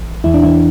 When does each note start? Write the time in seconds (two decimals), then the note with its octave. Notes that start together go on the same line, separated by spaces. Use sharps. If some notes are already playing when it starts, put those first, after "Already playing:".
Already playing: A1 E3
0.24 E2 E3 E4
0.34 D4
0.43 E3 E4